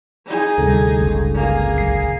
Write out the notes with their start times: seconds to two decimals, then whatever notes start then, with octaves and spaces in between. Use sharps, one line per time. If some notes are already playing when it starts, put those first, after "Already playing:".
0.26 D#4 G#4
0.58 D2 C3 G3 C4 A4
0.99 G1 C#2
1.34 A#3 G#4
1.75 B1 C7